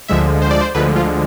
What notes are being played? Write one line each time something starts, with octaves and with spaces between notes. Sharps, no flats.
D2 D3 F3 G#3 E5
C5
D5
C5
D2 D3 F3 G#3 B4
F4